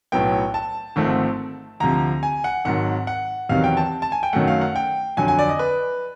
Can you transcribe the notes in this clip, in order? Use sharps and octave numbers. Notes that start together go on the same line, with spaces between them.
B1 A2 F#3 B3 G5
A5
G#1 G#2 F3 A3 C4
D2 C3 F3 A#5
G#5
F#5
G#1 G#2 D#3 F#3 F#5
F#5
E2 C3 D#3 F#3 F5
G5
A5
A5
G#5
G5
F#2 D#3 F#3 A3 F#5
F5
F#5
G5
F2 D3 F#3 G#5
G#5
D5
D#5
B4